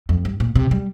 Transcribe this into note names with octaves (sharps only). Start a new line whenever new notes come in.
F2
G2
A#2
C3
G3